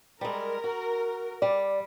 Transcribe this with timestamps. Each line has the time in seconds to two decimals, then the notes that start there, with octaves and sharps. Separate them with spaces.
0.21 G3 G#3 A#4
0.64 F#4
1.42 G3 D5